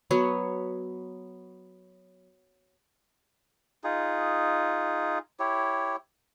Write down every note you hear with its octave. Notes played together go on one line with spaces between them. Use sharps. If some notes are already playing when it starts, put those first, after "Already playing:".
F#3 B3 C#5
D#4 F4 G#4
E4 G4 C#5